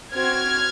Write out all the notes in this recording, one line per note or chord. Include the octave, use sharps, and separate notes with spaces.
C4 F#4 F6 G#6